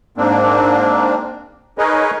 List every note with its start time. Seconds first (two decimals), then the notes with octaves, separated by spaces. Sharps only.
0.17 G#2 A#3 C4 D4
1.78 D#4 G#4 A#4 B4 C#5 D#5